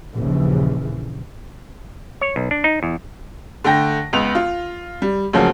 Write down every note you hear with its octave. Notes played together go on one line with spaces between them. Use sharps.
A#1 D#2 C#3 E3
C#5
B1
D4
D#4
E2
D3 A3 G5 A#6
C#2 B3 F7
F4
G3
D2 C#3 F3 F#3 A#3